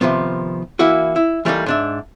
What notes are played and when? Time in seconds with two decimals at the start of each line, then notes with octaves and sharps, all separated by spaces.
0.01 C3 D#3 F3 B3
0.79 E3 A#3 E4 F#4
1.16 E4
1.45 E3 G3 A3 A#3 D#4
1.66 G#2 D4 E5